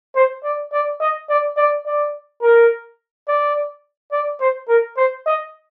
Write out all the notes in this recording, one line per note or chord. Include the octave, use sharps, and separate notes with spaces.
C5
D5
D5
D#5
D5
D5
D5
A#4
D5
D5
C5
A#4
C5
D#5